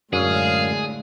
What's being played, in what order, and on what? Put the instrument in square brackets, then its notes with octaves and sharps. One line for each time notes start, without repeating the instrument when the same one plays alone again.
[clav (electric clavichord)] F#2 [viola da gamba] A2 D3 G#3 [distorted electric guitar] G#4 [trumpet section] F5